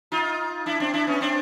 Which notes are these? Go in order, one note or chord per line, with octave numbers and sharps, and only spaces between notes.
D#4 F4
D4 E4
C4 D4
D4 E4
B3 C#4
C4 D4